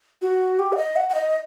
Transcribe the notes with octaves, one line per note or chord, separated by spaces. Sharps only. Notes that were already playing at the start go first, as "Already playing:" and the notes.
F#4
G4
F#5
D#5
F#5
F#5
D#5